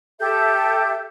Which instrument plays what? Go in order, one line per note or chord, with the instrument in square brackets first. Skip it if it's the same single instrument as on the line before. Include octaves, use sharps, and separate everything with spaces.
[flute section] G4 A4 E5 G6